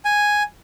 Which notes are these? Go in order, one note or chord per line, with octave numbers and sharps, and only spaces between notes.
G#5